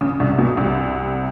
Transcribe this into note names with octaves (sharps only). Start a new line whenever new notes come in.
C#2 C#3
C2 C3
B1 B2
C2 C3